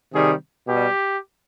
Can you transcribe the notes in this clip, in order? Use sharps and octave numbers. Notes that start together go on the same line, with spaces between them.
C3 D#3 G3 G#4
B2 G3 G4